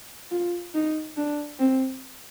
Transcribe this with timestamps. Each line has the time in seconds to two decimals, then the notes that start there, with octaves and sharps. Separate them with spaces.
0.31 F4
0.74 D#4
1.17 D4
1.59 C4